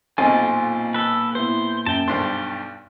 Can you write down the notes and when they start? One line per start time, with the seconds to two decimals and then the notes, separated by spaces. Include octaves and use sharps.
0.18 B1 F2 A#2 C4 F4 D#5 G#5
0.94 A4 B4
1.35 B3 E4 C5
1.86 F#2 G5 A5
2.08 B1 G2 C5 A6